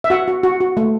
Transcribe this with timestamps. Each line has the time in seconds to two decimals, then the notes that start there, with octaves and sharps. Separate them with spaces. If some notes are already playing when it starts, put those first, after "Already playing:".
0.04 E5
0.10 F#4 F#5
0.28 F#4
0.43 F#4
0.60 F#4
0.77 A3